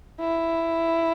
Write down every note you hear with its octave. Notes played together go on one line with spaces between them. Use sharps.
E4